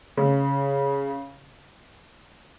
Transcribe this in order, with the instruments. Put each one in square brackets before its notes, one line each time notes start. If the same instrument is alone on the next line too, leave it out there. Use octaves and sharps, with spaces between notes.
[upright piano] C#3